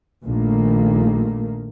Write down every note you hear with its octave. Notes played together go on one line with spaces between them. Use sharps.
A#1 A#2 D#3 A3 A#3